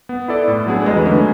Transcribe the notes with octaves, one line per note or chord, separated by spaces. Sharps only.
B3
E4 A4 D5
A2
F#3 B3 D4 G#4
F#3 G#3
E3
D3 A3 C#4 G#4